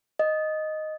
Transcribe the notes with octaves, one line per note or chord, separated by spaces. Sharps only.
D#5